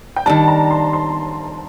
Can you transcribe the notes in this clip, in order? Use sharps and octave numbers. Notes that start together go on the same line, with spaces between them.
G5
D#3 G3 D4 A5
A#5
C6
C6